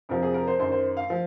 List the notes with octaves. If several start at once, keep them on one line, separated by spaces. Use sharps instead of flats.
F2 C3 F3 A#4
G#4
A#4
C5
F#2 D#3 C5
C5
F5
F3